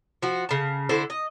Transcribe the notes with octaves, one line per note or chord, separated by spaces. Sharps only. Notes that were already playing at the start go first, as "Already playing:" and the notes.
F3 F#4
C#3 A5
D3 E4 A4 C5
D#5